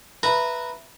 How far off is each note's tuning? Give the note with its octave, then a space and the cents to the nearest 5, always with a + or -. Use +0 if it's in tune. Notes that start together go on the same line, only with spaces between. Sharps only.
B4 +0 E5 +0 A#5 -15